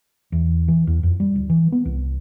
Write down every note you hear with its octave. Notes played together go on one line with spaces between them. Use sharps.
E2
E3
E2
F2
G3
D1
E3
B3
C2